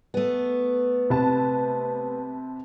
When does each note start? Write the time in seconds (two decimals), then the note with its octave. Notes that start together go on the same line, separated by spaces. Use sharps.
0.14 A3 B3
1.10 C3 B4 A5